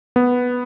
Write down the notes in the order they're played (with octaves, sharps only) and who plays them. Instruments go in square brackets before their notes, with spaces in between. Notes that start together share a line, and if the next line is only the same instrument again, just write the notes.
[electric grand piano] B3